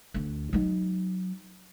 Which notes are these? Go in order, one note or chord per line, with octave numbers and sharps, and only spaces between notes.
D2 D4
F#3 D#4